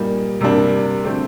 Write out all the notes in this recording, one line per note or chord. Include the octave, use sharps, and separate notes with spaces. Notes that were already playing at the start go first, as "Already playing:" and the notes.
Already playing: A#2 G3 A#3 D#4
C3 G3 A#3 D4
D3 A3 C4